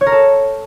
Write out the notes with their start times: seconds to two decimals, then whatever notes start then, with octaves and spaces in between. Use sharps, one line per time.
0.01 C#5
0.06 A#4
0.12 A4